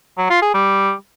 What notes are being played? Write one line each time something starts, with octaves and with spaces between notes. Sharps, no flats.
F#3
F4
G#4
G3